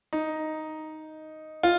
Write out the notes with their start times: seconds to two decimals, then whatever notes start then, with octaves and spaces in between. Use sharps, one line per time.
0.13 D#4
1.63 F4